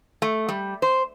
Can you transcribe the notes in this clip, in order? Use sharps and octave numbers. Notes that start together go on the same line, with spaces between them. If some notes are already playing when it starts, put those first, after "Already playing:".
A3
G3
C5